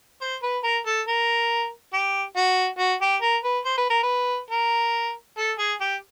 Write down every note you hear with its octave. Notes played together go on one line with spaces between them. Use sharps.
C5
B4
A#4
A4
A#4
G4
F#4
F#4
G4
A#4
B4
C5
B4
A#4
B4
A#4
A4
G#4
G4